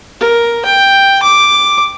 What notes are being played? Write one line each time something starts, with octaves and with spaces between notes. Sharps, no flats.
A#4
G5
D6